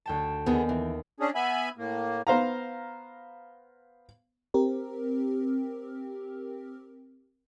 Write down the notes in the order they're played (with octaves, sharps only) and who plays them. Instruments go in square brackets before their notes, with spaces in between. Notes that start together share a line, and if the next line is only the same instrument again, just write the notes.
[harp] D2 G5 A5
[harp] D#2 [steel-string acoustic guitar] B3 G#4 A4
[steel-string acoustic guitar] E3
[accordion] C#4 D4 G#4
B3 E5 G#5 B5
A2 A#3
[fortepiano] B3 C5 F5 A#5
[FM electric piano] C4 G4 A#4